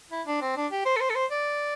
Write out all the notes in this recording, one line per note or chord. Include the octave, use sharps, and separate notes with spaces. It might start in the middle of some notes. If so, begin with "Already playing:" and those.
E4
D4
C4
D4
G4
C5
A4
C5
A4
C5
D5